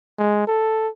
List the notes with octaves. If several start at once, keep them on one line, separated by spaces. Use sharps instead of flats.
G#3
A4